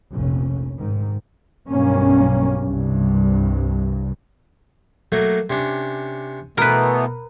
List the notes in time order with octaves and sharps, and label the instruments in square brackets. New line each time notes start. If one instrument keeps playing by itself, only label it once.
[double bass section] F1 A#1 C3 C#4
G#2 D#3
B1 G2 A#3 C#4
C2 G2
[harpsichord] F#3 A3 A#3
C3 C#4 D4
[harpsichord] B2 [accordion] E3 A3 B3 [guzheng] A#4 B4